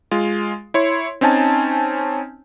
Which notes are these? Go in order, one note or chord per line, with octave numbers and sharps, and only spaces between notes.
G#3 F4
E4 C#5 C6
C4 C#4 D#4 G#5 A5